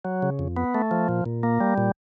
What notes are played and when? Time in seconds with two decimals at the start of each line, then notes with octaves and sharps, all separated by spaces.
0.05 F#3
0.22 C#3
0.39 F2
0.57 B3
0.75 A3
0.91 F3
1.09 A#2
1.26 A#2
1.43 A#3
1.61 G3
1.78 A#2